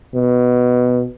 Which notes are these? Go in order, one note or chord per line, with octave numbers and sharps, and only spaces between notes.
B2